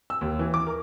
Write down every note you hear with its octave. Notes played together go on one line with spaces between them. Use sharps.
E6
D#2
E3
D6
A#4